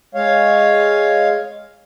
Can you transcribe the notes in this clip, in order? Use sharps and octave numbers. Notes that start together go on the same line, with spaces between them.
G#3 C#5 F5